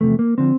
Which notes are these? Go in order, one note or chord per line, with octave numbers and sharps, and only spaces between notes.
E2 C3 F3 A3
A#3
D3 F3 C4